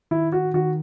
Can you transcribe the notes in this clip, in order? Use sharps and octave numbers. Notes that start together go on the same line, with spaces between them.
D#3 E4
F#4
D#3 F#4